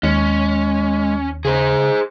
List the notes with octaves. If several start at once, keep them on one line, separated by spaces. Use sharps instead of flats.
D#2 G#3 C#4
C#3 G#4 C5